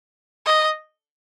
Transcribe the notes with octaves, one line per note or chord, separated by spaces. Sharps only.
D#5